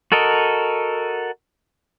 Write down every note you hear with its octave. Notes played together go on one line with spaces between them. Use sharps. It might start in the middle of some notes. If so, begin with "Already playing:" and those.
F#4 A4 A#4 D#5